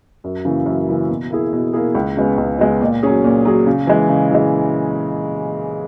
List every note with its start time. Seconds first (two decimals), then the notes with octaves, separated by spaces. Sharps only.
0.24 F#2
0.45 C#3 E3 A#3 E4
0.66 F#2
0.88 C#3 E3 A#3 E4
1.09 B2
1.30 A#3 E4 G#4
1.53 B2
1.73 A#3 E4 G#4
1.95 C#2
2.17 C#3 G#3 B3
2.38 C#2
2.59 C#3 G#3 B3
2.81 A#2
3.03 F#3 C#4 G#4
3.24 A#2
3.45 F#3 C#4 G#4
3.66 C#3
3.87 E3 G#3
4.09 C#3
4.31 E3 G#3